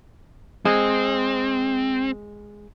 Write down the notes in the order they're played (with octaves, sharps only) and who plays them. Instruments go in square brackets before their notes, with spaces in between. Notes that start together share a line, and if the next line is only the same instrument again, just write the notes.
[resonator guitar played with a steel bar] G#3 [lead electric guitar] C4